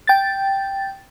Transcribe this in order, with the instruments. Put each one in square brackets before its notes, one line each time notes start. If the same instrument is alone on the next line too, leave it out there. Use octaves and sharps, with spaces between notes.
[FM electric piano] G5 A6